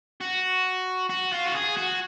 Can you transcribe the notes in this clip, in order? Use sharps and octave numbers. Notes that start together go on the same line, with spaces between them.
F#4
F#4
F4
F#4
G#4
F#4